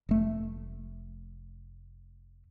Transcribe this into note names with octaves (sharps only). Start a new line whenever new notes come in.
F1 A3